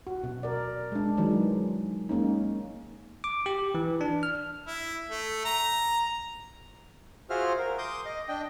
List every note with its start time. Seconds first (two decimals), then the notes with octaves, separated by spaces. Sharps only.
0.07 F#4
0.24 B2
0.43 A#4 D5
0.92 G#3 D4
1.17 D#3 E3 F#3 G#3 D#4
2.09 G#3 A#3 C#4 D#4
3.24 D6
3.46 G4
3.75 E3
4.01 D4
4.23 F6
4.67 E4
5.09 A3
5.45 A#5
7.30 F4 F#4 G#4 C5 E5 F6
7.58 A#4
7.78 C6 D6 D#6 G6
8.05 D#5
8.29 D4 D#5 G5